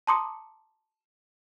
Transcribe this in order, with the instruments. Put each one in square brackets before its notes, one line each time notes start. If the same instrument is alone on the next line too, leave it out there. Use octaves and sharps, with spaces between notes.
[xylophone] A5 A#5 C6 D6 D#6 C#7